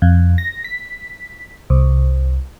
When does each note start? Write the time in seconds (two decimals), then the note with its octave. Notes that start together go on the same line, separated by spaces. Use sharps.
0.02 F2
0.38 A#6
0.64 B6
1.70 C2